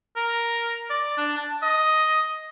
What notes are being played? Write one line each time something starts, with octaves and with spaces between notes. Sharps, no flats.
A#4
D5
D4
A5
D#5